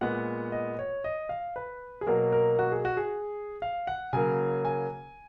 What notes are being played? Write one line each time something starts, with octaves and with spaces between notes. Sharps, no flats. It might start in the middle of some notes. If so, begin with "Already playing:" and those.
A#2 G#3 B3 F#5
D#5
C#5
D#5
F5
B4
G#4
B2 F#3 A#3 A#4
A#4
F#4
G#4
F#4
G#4
F5
F#5
C#3 F#3 A#3 G#5
G#5